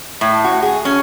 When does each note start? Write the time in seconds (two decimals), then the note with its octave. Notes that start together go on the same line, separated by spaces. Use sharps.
0.21 A2
0.44 F#4
0.62 G#4
0.85 C#4